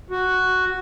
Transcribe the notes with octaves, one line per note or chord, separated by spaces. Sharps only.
F#4